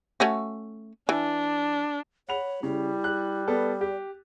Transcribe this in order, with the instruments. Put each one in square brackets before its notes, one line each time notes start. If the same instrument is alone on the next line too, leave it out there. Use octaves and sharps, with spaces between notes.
[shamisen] A3 C#4 F#4
[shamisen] E3 [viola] D4
[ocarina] C#5 [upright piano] F#5 B5 F7
[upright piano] C#3 [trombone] G3 [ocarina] E4
[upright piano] F#6
[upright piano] B3 A4 [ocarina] D5
[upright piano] G4